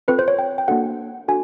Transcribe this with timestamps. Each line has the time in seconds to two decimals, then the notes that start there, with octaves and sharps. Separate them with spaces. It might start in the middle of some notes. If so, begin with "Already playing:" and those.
0.08 C4 F4 A4 B4
0.19 C5
0.28 C#5
0.39 G5
0.58 G5
0.68 A#3 D4 F#4 A4 F#5
1.28 D4 F#4 A4 G#5